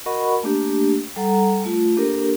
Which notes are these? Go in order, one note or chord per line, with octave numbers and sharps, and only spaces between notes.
F#4 A#4 D#5 F#5 B5 C#6
A3 A#3 D4 G4
G3 A4 F#5 A#5
A3 F4
A#3 D4 G4 A4 A#4